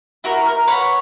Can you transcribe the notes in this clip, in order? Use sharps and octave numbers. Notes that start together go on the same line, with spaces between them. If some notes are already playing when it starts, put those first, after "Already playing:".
E4 F#4 A#4
A#4 F6
B4 C#5 F#5 B5